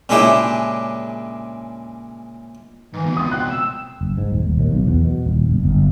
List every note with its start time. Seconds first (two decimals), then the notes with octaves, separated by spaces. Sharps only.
0.09 A#2 C#3 G#3 D4 E4 G4
2.93 G#2 D#3 E3
3.05 C#2 B2
3.17 C4 F4 D#6
3.32 G5 C6 F#6
3.50 E6
4.01 F#1
4.18 G#2
4.32 D#1
4.45 D#1
4.59 D#2
4.72 B1
4.87 E2
5.04 B2
5.26 D#1
5.50 F#1
5.63 G1